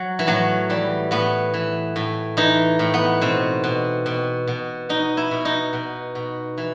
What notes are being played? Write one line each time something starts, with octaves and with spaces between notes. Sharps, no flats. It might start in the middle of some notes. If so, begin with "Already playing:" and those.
Already playing: F#3
E3
A2 F#3
E3 G3
A2 B3
E3
A2
E3 D#4
A2
B3
B2 C4
B2
B2
B2
B2 D#4
E4
B2
D#4
B2
B2
E3